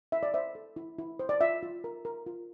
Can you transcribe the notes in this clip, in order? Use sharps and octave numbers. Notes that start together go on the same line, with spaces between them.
E4 E5
D5
C5 E5
A4
E4
E4
C5
D5
F4 E5
F4
A#4
A#4
F4